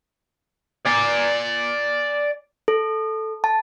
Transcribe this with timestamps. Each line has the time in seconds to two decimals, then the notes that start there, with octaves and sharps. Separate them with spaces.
0.86 D5 G#5
2.68 A4
3.44 A5